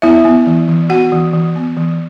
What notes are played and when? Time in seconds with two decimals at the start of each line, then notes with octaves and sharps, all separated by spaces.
0.02 B3 E4 E5
0.25 B3
0.47 E3
0.68 E3
0.90 B3 F#4 F#5
1.12 E3
1.33 E3
1.56 B3
1.77 E3